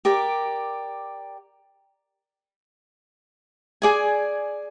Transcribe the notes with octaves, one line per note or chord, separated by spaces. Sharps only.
G4 A#4 D5
G#4 D5 G#5